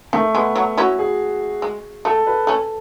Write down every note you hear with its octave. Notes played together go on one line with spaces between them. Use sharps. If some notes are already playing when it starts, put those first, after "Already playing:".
D#3 A3
G#3 B3
F#3
C#4 E4 F#4
G#4
G#3
A3 A4
B4
A3 C#4 A4